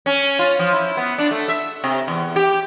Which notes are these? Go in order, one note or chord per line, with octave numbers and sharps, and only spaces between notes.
C#4
F4
F3
E4
B3
D4
A3
E5
C3
E2
G4